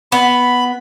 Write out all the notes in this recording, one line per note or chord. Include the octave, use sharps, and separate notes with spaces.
B3 B5